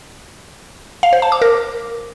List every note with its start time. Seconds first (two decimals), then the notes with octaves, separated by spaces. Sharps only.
1.03 F5
1.13 C5
1.22 A5
1.32 D6
1.42 A#4